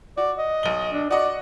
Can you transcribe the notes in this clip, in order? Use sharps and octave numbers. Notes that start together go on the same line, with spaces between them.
F#4 D5
D#5
B1 G7
D4
F#4 D5 D#5 F#5